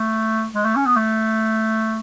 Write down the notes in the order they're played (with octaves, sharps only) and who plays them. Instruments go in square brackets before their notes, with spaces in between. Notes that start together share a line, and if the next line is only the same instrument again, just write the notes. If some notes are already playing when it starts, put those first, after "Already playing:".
Already playing: [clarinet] A3
G#3
A3
C#4
B3
A3